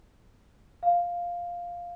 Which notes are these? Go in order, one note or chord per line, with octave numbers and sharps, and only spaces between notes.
F5